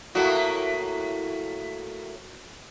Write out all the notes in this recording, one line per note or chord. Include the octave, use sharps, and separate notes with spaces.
A2 A#3 F#4